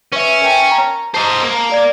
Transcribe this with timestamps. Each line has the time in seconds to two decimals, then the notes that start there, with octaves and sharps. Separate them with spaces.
0.12 C#4 B4 E5
0.42 A#4 G5 A5
0.71 A#5
1.14 C5 D#5 A5 A#5
1.43 A#3
1.70 A#4 D5 G#6